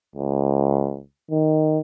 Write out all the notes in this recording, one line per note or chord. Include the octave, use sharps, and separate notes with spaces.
C#2
D#3